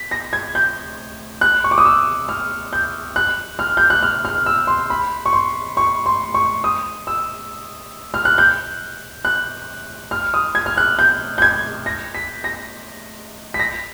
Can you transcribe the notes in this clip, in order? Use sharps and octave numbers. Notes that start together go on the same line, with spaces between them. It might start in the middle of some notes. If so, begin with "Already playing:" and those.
Already playing: B6
A#6
G#6
G6
F#6
C#6
D6
D#6
E6
F6
G6
F#6
F6
G6
F#6
F6
F6
E6
C6
B5
C#6
C6
C#6
C6
C#6
D#6
E6
F6
F#6
G6
F#6
F6
D#6
G#6
F6
F#6
G6
G6
G#6
A#6
B6
A#6
B6
A#6